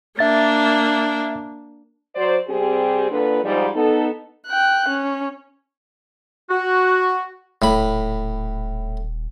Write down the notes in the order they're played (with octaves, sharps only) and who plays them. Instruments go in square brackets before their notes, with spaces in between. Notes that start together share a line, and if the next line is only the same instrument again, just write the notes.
[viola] A#3 D4 [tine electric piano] E5 A6
[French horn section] F#3 C5 D5
C3 G3 C4 G4 G#4
A#2 D3 B4
G#2 F3 G3
B3 D#4 A4
[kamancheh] G5 F#6
C#4
[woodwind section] F#4
[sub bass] D#1 [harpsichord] A2 B5